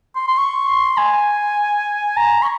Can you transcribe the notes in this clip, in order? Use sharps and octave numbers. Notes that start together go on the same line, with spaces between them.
C6
C6
C#6
C6
G#5
A#5
C#6